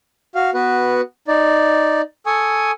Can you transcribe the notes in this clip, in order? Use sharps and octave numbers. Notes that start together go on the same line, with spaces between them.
F#4 F5
B3 F#4 B4
D#4 D5
A4 G#5 C#6 D#6